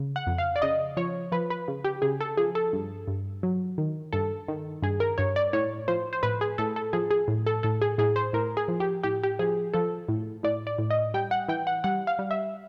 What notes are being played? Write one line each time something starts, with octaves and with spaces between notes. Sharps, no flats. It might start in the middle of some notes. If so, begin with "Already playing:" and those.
Already playing: C#3
F#5
F2
F5
D5
C#3 D#5
F3 C#5
F3 B4
B4
C#3
G4
C#3 G#4
A4
F3 G#4
A4
G2
G2
F#3
D#3
G2 A4
D#3
G2 G#4
A#4
G2 C#5
D5
A2 C#5
F3 C5
C5
A2 B4
G#4
A2 A4
A4
F3 G#4
G#4
A2
A4
A2 A4
G#4
A2 G#4
C5
A2 A#4
G#4
F3
G4
A2 G4
G4
F3 G#4
F3 A4
A2
A2 D5
D5
A2
D#5
G3 G5
F#5
E3 G5
F#5
G3 F#5
F5
G3
E5